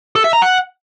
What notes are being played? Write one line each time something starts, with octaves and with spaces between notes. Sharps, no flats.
A4
E5
A#5
F#5